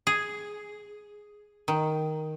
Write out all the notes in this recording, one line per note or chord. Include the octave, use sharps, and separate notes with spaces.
G#4
D#3